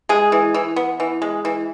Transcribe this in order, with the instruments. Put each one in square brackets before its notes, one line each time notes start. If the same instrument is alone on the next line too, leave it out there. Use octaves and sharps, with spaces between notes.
[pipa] G#3 G#4
E3
E3
B3
E3
G#3
E3